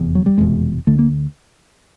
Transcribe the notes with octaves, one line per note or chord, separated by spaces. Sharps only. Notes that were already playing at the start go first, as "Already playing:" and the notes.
Already playing: F1 E2
F#3
G3
F1 E2 B2 G#3
D2 D3 A3
A#3